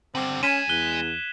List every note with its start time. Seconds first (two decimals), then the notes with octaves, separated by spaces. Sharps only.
0.15 D3 G3 C4 F#7
0.43 G#3 C#4 G#5 G#6 B6 D#7 E7
0.69 E2 F#6 G7